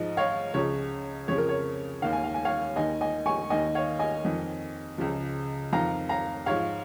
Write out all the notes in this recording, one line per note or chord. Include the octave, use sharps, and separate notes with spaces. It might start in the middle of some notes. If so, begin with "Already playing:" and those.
Already playing: G#2 F3 D#5
C#5 F5
C#2 C#3 F3 C#5
F2 C#3 F3 C#5
A#4
C#5
D#2 D#3 F5
G#5
F5
G#5
C#5 F5
D#2 D#3 D#5 G#5
D#5 G#5
G#5 C#6
D#2 D#3 D#5 G#5
C#5 F5
D#5 G#5
F2 D#3
C#2 C#3 F3
F2 D#3 F5 A#5
F5 A#5
G#2 F3 C#5 F5